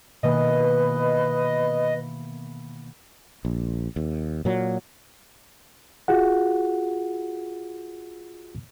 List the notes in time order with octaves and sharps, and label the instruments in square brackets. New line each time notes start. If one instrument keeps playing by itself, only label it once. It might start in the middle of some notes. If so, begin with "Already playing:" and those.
[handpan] B2 D#3 A#3 [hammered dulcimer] E3 B3 [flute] B4 [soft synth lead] D#5
[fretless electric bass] A#1
D#2
A#2 F#3
[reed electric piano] F4 F#4 G#4 F#5